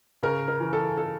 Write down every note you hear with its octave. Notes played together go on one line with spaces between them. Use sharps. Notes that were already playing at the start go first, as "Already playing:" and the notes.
C#3 A#4
A#4
E3
A4
A4